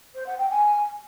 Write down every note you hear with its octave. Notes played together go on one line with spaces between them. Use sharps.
C5
F#5
G5
G#5